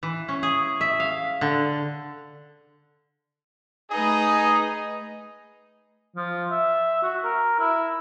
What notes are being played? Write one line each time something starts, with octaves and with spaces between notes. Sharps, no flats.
E3
C#4
G#4
E5
F5
D3
A3 D#4 G#4 B4 D#5 D#6
F3
E5
F#4
A#4
E4